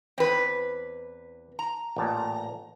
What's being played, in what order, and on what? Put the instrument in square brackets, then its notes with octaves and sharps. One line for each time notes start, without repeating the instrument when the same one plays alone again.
[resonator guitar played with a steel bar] E2 B4 [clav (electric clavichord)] C4
[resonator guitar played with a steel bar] A#5
[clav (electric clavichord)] A1 A#2 A5